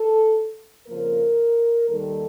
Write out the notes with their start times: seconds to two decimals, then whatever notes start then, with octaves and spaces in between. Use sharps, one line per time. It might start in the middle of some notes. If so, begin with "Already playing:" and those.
Already playing: A4
0.87 F2 C#3 F3 A#3 A#4
1.89 D#2 D#3 G3 A#3 A4